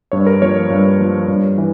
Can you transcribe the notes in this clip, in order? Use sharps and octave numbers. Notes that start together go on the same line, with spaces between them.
G2 C#5
A#4
F3 A#3 C#5
G2
F3 A#3
G2
E3